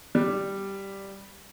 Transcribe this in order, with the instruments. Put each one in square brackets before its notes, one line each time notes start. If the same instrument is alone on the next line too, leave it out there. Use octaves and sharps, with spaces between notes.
[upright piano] G3